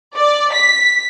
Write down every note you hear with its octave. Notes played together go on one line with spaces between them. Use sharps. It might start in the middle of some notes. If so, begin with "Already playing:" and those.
D5
B6